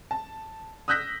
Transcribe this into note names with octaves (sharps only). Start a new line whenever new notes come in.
A5
D#6 E6 F#6 G6 A#6 B6